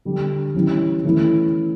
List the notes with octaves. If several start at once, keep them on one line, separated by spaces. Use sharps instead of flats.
D3 G3 D4
E3 G3 C#4 E4
E3 A3 C#4 E4